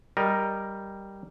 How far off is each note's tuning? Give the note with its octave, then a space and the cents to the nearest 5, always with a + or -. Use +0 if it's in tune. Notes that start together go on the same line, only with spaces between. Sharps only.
G3 +0 A#4 +5 D#5 +0